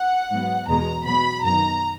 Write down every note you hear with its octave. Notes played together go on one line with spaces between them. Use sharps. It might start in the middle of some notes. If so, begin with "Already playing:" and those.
Already playing: F#5
G#2 F#3 B3
E2 B2 G#3 B3 A#5
B2 F#3 B3 B5
F#2 D#3 F#3 B3 A#5